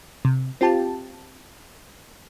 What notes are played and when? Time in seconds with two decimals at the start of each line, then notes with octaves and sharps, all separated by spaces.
0.25 C3
0.61 C4 F4 G4 A5